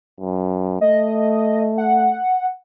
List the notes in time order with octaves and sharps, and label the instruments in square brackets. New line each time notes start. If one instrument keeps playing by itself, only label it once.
[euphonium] F#2
[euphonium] A3 [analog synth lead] D#5
[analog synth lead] F#5